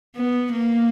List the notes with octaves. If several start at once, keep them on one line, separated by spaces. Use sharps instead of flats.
B3
A#3